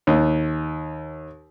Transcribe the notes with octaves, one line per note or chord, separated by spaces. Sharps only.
D#2